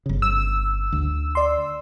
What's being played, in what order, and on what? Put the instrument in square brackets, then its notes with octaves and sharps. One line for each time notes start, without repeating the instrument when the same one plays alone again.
[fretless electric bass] G1 C#3
[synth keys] E6
[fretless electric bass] D2
[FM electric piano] D5 C6